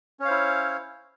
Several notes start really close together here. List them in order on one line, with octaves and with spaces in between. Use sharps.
C#4 C#5 F5 C5 E4